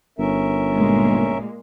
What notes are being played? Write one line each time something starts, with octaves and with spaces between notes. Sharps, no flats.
G1 C#4 A#4 E5
A#2 G#3 A#3